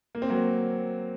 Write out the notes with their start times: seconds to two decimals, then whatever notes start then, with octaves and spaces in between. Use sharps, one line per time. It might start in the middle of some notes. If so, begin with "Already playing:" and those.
0.15 A#3
0.22 C4
0.30 F#3 A#3